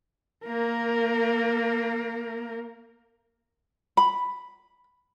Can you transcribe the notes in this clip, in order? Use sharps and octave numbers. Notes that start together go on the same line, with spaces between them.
A#3 A#4
B5